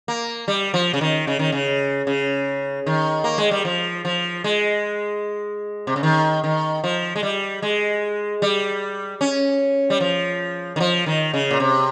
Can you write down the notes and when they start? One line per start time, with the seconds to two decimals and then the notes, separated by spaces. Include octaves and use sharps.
0.08 A#3
0.48 G3
0.74 F3
0.93 C#3
1.01 D#3
1.27 C#3
1.39 D#3
1.52 C#3
2.07 C#3
2.86 D#3
3.24 A#3
3.38 G#3
3.51 G3
3.65 F3
4.05 F3
4.44 G#3
5.87 C3
5.96 C#3
6.03 D#3
6.44 D#3
6.84 F3
7.16 G#3
7.23 G3
7.62 G#3
8.42 G3
9.21 C#4
9.90 G3
10.00 F3
10.76 D#3
10.80 F3
11.06 D#3
11.33 C#3
11.51 A#2
11.60 C3